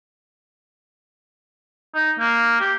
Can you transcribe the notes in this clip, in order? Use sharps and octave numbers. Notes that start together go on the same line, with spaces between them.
D#4
A#3
G4